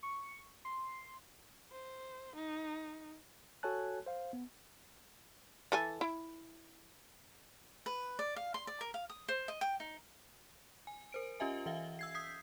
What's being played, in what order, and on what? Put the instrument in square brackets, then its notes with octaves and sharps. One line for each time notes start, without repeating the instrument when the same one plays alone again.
[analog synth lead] C#6
C6
[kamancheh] C5
D#4
[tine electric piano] F#4 A4 C#5 G#5 A5 F#6
C5 F5
B3
[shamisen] E3 A4 G#5
E4
[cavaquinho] B4
D5
F5
C6
D5
A#4
F5
D#6
C5
D#5
G5
D#4
[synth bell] G#5
A#4 C5 D7
C#4 F4 G4 D#5 E5 G#5
E3 E5 F5
E6 G#6 C7
D#6 G6 B6 C7